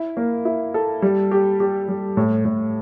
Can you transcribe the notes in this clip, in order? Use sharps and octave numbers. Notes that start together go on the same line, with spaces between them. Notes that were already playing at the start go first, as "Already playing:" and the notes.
Already playing: E4
A#3
E4
A4
G3
G4
G4
G3
A2
A2